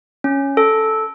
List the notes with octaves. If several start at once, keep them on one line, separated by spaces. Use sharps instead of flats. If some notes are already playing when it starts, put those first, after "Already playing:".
C#4
A4